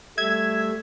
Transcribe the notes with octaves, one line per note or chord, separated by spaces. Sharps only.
G3 A3 E5 G#6